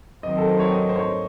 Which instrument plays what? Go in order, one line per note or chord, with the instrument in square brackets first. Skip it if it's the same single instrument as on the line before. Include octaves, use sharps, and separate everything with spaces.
[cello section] D#3 F#3 C4 [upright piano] D#5
[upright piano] A4
C5
C#5
D#5
C5
C#5